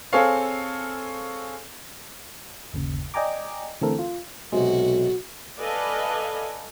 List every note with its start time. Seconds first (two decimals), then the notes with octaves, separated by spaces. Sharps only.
0.13 C4 G#4 A4 C#5 F5
2.73 G1 D#2 C#3
3.14 D5 D#5 G5 G#5 A#5 D6
3.81 D3 E3 A3 C4 A4 A#4
3.99 F4
4.52 B1 C3 G#3 F#4
5.60 A4 B4 D5 D#5 F5 G#5